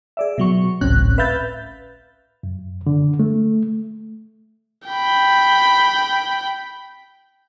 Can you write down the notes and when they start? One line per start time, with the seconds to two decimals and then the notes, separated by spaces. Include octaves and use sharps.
0.17 G#4 D5 E5
0.38 B2 F#3 C#6
0.81 G#1 C#2 A2 C4 C#4 F#6
1.18 B4 E5 F5 B5 G6 A6
2.43 F#2
2.87 D3
3.20 A3
4.88 G5 B5